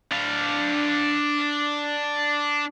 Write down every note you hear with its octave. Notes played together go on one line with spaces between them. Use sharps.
D4 F5